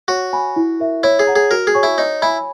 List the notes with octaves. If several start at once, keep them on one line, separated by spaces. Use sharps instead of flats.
F#4 C#5
G#5 B5
E4
A#4 E5
E4 C#5
G#4
F#5 A#5
G#4
F#4 A#4
G#4
C#5 G#5 C#6
E4
D#4 C#5
E4 G#5 B5